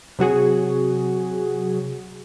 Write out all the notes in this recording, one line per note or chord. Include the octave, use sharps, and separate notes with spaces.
C3 F#3 F#4 G#4